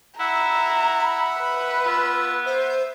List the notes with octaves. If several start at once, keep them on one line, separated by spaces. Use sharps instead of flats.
E4 E5 F#5 A#5
B5
B4
B3 F4 E6
C5 E5